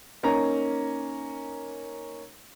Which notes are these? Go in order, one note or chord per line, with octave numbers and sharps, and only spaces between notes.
A#3 C#4 D#4 A#5